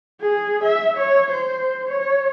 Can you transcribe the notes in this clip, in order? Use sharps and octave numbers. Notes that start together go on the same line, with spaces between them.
G#4
E5
C#5
C5
C#5